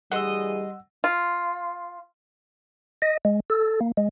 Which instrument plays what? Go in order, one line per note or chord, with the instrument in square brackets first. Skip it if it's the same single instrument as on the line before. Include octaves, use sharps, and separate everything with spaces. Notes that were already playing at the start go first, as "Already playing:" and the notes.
[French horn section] D2 E3 G#4 [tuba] G3 [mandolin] D#5 C6 [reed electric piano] F#5 E6
[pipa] F4
[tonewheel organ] D#5
G#3
A4
A#3
G#3